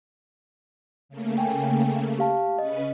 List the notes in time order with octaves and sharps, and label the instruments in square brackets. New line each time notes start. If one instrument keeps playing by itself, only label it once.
[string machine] C#3 A3 A#3
[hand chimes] G5 G#5
G4 F5 A5
[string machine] C#3 C#4 B4 [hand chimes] D#5